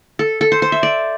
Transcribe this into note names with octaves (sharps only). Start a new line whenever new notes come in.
A4
A4
C5
C5
E5
D5